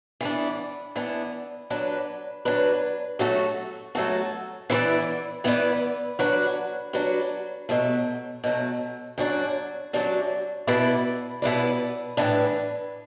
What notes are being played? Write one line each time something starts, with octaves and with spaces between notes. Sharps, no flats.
E3 B3 D4
E3 B3 D4
F#3 D4 B4
F#3 D4 B4
F#3 A3 F#4 A4
F#3 A3 F#4 A4
E3 B3 E4 B4 D5
E3 B3 E4 B4 D5
F#3 D4 F#4 B4
F#3 D4 F#4 B4
B2 F#3 A3
B2 F#3 A3
F#2 F#3 D4 F#4 D5
F#2 F#3 D4 F#4 D5
B2 B3 E4 B4 D5
B2 B3 E4 B4 D5
A2 E3 D4 B4